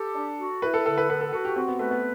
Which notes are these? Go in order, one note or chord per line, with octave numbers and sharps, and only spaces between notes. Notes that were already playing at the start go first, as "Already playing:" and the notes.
Already playing: G4 A4
D4
F#4
E4 B4
A4
D3 A4
B4
B3 B4
A4
F#4 A4
G4
C4 F#4
B3
A3 B4
B3